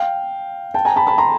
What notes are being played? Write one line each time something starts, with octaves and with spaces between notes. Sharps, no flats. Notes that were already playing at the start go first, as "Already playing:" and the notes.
Already playing: F5 G5
G5 A5
G#5 A#5
A5 B5
A5 B5
A#5 C6